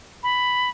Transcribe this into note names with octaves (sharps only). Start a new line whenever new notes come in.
B5